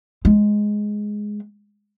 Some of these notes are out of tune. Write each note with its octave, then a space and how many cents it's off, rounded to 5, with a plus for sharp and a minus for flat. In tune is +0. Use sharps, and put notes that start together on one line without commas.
G#3 +5